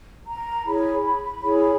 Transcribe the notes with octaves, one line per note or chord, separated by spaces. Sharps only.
A#5
E4 G#4 C#5 B5
E4 G#4 C#5